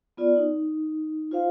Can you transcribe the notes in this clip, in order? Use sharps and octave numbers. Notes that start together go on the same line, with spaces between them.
B3 F4 D5
D#4
F4 C5 F5